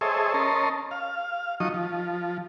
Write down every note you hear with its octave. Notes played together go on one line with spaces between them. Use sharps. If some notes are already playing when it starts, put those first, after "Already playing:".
G#4 A4 C5 C#5 D#5 E5
C#4 A#4 C#5 D#5 A5 C6
F5
F3 F#3 D#4 D#5 C#6 D#6
F3